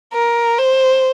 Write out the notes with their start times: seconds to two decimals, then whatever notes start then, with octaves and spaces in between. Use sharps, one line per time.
0.13 A#4
0.58 C5